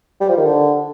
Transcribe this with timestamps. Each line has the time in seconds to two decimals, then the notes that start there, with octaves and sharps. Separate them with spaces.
0.21 G3
0.29 F3
0.37 D#3
0.45 D3